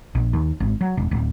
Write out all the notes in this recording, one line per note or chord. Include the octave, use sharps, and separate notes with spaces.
A#1
D#2
G#1
F#3
E1
D1